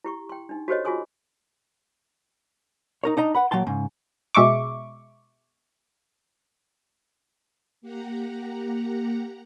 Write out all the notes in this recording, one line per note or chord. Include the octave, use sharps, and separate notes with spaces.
E4 G4 C#6
G5 C6
D4 D#4
F#4 G4 A4 C5 C#5 D#5
F4 F#4 G#4 G#5 C6 D#6
D#4 A#4 C#5
D4 D#4 D#5 A#5
B4 F#5 B5
A#2 F#3 F5 G5 A5 C6
G#2 C#3
B2 G#3 E5 C#6 D6
A#3 G4 F#5 A#5